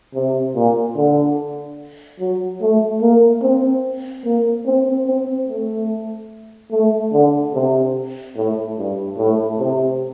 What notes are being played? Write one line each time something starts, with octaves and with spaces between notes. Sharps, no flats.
C3
A#2
D3
F#3
A3
A#3
C4
A#3
C4
C4
A3
A3
D3
C3
A2
G2
A2
C3